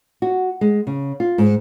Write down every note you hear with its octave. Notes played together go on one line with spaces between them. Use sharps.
F#4
G#3
C#3
F4
G#2